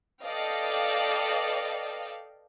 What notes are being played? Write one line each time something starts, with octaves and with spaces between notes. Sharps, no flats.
A4 B4 D5 D#5 F5 G5